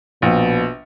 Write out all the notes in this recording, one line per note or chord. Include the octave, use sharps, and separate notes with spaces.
A#1 B2